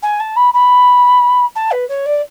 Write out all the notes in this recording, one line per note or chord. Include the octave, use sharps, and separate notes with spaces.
G#5
A5
B5
B5
A5
B4
C#5
D5